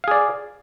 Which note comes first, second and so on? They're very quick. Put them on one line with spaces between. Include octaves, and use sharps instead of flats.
F5 G#4 D5